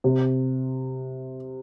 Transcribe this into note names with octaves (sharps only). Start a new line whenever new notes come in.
C3